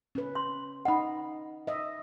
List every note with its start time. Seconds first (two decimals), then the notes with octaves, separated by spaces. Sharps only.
0.15 C#4 B4
0.35 C6
0.85 D#4 D#5 F#5 B5
1.67 D#5 E5